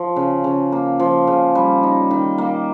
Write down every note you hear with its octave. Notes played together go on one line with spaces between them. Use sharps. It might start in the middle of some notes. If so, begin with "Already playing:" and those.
Already playing: F3
C#3
C#3
A#3
F3
C#3
G3
D#4
D#3
A#3